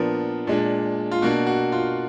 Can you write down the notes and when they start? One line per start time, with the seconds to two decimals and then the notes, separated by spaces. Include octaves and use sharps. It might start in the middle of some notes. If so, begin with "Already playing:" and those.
Already playing: A#2 F3 B3 D4 A#4
0.47 A#2 G#3 D4
1.11 F4
1.22 B2 A#3 D4 F#4
1.47 F#4
1.72 F4